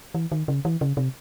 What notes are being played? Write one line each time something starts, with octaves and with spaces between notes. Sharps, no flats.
E3
D#3
C#3
E3
C#3
C3